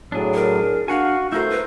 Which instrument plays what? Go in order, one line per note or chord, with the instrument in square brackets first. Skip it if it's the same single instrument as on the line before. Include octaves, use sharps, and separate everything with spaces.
[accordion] A2 F#3 [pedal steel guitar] D4 G#4
[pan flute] A#4
[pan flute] D4 [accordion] F#4 [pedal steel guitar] F5 F#5 G#5
[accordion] A3 G6 [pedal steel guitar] E4 A#4 C5 [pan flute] F#4
[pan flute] B4